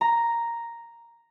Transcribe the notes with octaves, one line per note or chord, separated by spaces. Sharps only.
A#5